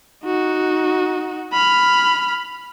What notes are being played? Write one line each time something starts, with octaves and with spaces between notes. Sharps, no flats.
D#4 F#4
B5 F6